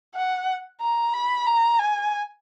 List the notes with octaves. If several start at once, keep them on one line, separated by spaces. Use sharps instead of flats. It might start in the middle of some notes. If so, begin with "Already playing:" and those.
F#5
A#5
B5
A#5
G#5